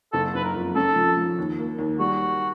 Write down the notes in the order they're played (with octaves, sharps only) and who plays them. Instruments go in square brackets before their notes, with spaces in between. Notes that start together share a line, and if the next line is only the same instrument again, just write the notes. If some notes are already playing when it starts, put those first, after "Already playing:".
[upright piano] F#1 [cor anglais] A4
[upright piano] F#1 [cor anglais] B4
[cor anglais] A#4
[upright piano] F2
[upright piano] C#4 [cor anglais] A4
[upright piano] F3
F3
D#2
A#3
D#2
[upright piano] G3 [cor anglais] F#4